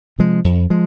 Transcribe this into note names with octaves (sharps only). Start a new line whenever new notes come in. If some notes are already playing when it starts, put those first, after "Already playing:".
C3 F3 G#3
F2
F3 G#3